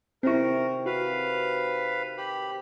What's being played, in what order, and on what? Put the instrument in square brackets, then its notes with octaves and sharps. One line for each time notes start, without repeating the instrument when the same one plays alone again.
[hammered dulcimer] C3 D#3 C#6 [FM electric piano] C4 E4 [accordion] A#4
[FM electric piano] F#4 [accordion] B4 F5
[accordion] G4 B5